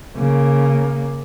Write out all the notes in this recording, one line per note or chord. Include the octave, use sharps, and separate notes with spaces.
C#3 A#3